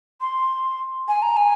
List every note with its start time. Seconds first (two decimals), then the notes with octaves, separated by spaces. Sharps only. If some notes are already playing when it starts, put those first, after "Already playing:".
0.21 C6
1.08 G#5
1.22 A#5
1.37 G#5